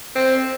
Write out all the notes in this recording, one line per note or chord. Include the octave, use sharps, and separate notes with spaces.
C4